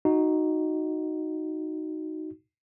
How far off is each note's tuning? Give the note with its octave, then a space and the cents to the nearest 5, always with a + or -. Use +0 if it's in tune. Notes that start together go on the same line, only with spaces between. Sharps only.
D#4 +0 F#4 +0